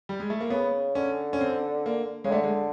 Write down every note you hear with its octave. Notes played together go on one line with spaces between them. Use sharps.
G3
G#3
A3
A#3
C#3 B3
D3 C#4
C#4
C4
A#3
C#3 G#3
D3 A3
G#3
G#3